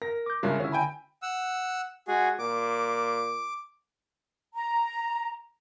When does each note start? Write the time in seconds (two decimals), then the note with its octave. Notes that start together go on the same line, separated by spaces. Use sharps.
0.02 A#4 A#6
0.26 D6 G6
0.43 G2 C#3 G#3 F4 A#4 E5
0.60 D3 C#4 E4
0.72 G5 G#5 B5
1.22 F#5 E6
2.08 G#3 F#4 G#4
2.39 A#2 D6
4.54 A#5